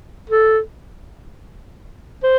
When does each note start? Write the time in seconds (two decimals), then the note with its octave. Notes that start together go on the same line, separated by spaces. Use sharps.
0.30 A4
2.23 C5